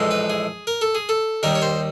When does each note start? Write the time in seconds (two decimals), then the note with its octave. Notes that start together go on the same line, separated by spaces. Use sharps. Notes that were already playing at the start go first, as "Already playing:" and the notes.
Already playing: A#1 A2 E3 G#3
0.11 B4
0.30 G#4
0.67 A#4
0.81 A4
0.95 G#4
1.09 A4
1.43 D#2 D#3 G3 A#4
1.55 C#5
1.62 C5